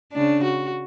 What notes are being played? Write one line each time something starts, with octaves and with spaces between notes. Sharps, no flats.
C#3 D4
F#4